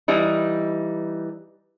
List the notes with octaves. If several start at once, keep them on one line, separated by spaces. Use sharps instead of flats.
E3 G3 D#4